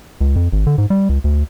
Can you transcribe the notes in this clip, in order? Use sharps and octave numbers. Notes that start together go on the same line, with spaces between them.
C#2
F2
G#1
D3
G#2
G3
C#2
D2